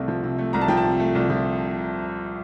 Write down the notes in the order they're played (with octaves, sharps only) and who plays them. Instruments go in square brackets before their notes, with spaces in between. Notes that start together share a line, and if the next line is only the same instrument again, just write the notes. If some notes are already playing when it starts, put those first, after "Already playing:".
Already playing: [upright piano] C2 C3 A3
F3
C3
A3
C2 A#5
A5
F3 G5
A5
C3
A3
C2
F3